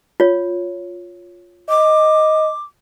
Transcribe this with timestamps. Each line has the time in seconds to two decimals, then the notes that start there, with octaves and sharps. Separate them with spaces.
0.20 F4 C#5
1.69 D#5 D6